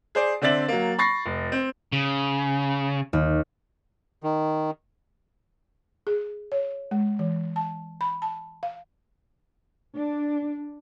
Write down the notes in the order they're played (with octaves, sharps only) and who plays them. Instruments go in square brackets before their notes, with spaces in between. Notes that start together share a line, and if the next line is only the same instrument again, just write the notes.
[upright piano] G#4 C5 D5
D3 C4 D5 E5 A6 F#7
F#3 A#3
B5 C#6 A6 A#6 C7
F1
C4
[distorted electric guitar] C#3
[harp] D#2
[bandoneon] D#3
[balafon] G#4
C#5
G#3
E3
A5
B5
A5
F5
[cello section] D4